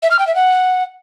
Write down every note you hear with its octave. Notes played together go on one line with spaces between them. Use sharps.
E5
F6
G5
E5
F#5